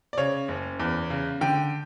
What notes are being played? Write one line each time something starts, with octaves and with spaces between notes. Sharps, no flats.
D5
C#3 C#5
F#1
E2
C#3
D3 G5